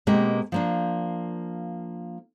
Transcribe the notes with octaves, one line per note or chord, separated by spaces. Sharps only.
B2 G#3 A#3 C4 G4 A#4
F3 A#3 D4